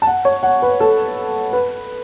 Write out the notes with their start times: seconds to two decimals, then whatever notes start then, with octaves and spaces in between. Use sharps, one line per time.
0.02 A5
0.07 F#5
0.25 C#5
0.43 F#5
0.62 B4
0.80 A4
1.53 B4